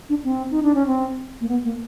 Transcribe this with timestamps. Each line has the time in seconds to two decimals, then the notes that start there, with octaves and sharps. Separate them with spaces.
0.10 D4
0.24 C4
0.51 D#4
0.63 D4
0.75 C#4
0.87 C4
1.41 A#3
1.49 B3
1.64 A#3